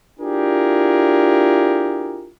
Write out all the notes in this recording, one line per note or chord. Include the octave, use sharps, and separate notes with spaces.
D4 E4 F4 G4 G#4 A#4